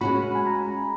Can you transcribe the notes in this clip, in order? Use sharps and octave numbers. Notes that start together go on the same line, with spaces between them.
G#3 C#4 F#4 B5
G#5
A#5